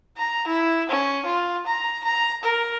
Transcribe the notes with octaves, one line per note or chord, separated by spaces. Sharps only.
A#5
E4
C#4
F4
A#5
A#5
A#4